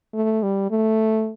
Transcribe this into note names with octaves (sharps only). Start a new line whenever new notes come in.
A3
G3
A3